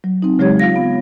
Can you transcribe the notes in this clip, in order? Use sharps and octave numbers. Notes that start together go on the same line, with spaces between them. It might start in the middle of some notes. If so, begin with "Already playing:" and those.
F#3
C4 D#4
C#3 F#3 G#3 G4 C#5 G#6
F4 F5 A#6
B3